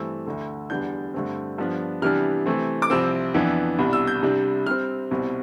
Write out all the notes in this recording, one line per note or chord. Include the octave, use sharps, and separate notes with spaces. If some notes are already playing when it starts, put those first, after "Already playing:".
Already playing: G2 E3 A3 C4 E6
D2 D3 A3
E2 D3 G3 B3 D4 G6
G2 D3 A3 C4
G2 F3 B3 D4
C3 E3 G3 B3 D4 F6
C3 E3 A3 C4
D6
C2 C3 F3 C4 E6
F2 E3 B3 D4
C2 B2 G3 D4
E6
G6
C2 C3 G3 D4
C3 G3 C4 F6
C2 B2 G3 C4